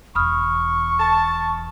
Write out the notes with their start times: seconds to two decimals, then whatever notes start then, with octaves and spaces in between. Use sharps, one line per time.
0.15 E1 E2 B5 C#6 D#6 F6
0.98 A5